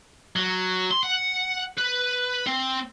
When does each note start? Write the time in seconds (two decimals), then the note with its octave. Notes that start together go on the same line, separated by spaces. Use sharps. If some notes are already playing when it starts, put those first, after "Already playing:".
0.36 F#3
0.91 C6
1.03 F#5
1.78 B4
2.46 C4